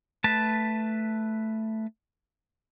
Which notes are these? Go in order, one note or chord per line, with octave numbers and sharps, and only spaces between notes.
A3 B4 A5